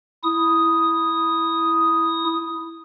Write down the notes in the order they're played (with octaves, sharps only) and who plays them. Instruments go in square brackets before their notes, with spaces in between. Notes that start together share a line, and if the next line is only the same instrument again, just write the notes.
[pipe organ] E4 D#6